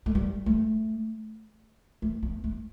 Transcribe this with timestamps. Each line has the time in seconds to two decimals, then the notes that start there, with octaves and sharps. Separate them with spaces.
0.06 A3
0.15 G3
0.46 A3
2.02 A3
2.23 B3
2.44 A3